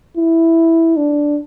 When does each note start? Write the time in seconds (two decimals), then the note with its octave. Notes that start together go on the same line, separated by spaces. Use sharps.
0.17 E4
0.96 D4